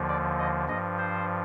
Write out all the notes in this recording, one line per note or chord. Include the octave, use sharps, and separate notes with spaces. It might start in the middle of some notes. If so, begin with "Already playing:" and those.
Already playing: D#2 D3 F3
D5
D#5
G2 F3 D#5
C5